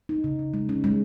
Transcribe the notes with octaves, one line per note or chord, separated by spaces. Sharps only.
D#4
C#3
C#3
G#3
C#4
G#3